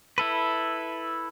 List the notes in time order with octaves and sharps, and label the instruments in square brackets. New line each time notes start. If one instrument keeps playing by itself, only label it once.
[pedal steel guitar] E4 A4 B4